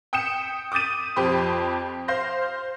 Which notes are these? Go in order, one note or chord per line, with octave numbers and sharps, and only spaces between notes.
G5 D#6 G6 C#7 E7
D6 D#6 G6 A6 D#7
F2 F3 G4 B5 C6 G6
C5 F5 C6 G6 A#6